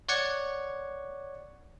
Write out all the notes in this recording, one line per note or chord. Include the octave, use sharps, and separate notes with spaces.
C#5 D5 F#5 G#6 C#7